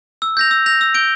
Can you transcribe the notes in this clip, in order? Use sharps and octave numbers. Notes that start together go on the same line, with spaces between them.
E6
G6 A#6 F7
E6
G6 A#6 F7
E6
G6 D7 G7